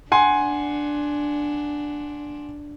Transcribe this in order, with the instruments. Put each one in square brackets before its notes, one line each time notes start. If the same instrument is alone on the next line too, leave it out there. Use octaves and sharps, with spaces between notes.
[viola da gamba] D4 [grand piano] F#5 G#5 C6